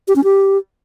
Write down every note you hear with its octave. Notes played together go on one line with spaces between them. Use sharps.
G4
C#4
G4